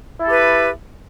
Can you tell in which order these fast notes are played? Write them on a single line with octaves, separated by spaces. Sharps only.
E4 A4 G4 B4